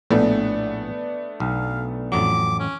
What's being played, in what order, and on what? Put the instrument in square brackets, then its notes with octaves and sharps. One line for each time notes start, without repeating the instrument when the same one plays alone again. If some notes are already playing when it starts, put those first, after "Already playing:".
[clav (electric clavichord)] A#1 A2 [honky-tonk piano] A3 B3 D4
[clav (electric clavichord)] B1 [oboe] F5
[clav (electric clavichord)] A1 F2 F#3 [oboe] D6
[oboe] C#4